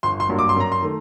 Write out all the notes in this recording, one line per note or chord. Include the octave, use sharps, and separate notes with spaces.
G1 C6
C6
G2 F#3 A#3
D6
C6
F#2 A#5
C6
D#3 A3